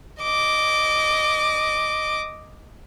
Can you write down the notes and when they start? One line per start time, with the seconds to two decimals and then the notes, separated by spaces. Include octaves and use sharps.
0.22 D#5 D6